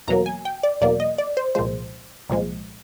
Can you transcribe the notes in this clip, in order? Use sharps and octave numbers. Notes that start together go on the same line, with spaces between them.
E2 B2 F#3 A#3 A#5
G#5
G5
D5
E2 B2 F#3 A#3 D5
D#5
D5
C5
C2 A#2 F3 G#3 C5
C2 A#2 F3 G#3